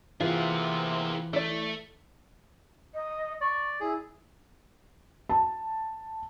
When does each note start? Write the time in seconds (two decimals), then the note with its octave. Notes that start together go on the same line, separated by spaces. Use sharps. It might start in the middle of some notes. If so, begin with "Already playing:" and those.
0.20 C3 E3 A#3 C4 E4 F4 G#4
1.33 A3 E4 D5
2.94 D#5
3.41 D5 C#6
3.80 E4 G#4
5.30 A5